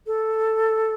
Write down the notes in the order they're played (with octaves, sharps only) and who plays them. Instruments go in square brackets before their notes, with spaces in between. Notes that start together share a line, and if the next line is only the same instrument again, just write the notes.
[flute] A4